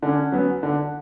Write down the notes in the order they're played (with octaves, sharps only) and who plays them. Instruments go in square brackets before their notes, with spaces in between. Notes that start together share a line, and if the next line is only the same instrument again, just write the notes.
[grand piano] D3 [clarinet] C#4
[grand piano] F#3 B3
D3